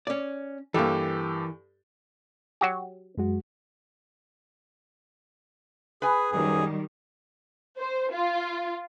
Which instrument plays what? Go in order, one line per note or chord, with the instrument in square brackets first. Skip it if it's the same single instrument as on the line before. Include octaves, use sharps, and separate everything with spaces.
[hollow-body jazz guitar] C#4 D5
[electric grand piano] G2 G4 A4 [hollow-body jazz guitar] E3 A#3
[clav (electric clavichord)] F#3 F#4 G4
[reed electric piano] F#2 G#3 F#4
[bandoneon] G#4 [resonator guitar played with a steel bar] B4 G#5
[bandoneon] F#2 G#4 [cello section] D#3 G3
[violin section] C5
F4